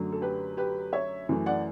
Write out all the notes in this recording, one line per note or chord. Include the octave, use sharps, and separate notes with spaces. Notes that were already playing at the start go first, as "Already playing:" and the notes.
Already playing: F#2 D3 F#3 A3
A4
G4 B4
G4 B4
C#5 E5
F#2 E3 A3
D5 F#5